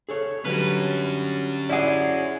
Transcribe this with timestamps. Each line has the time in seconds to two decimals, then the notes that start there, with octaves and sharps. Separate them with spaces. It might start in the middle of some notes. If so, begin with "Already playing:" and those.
0.09 G#4 A4 C#5
0.45 D3 F#3 G3 C#4 F#4 B4
1.69 E4 G#4 D5 F#5